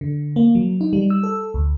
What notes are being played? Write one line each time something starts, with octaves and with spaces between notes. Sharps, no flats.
D3
A#3
F#3
D#4
G3
E6
A4
D2